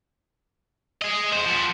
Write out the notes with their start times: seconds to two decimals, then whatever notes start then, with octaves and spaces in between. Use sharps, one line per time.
1.02 G#4 D#5
1.33 E2 C5
1.46 F3 B3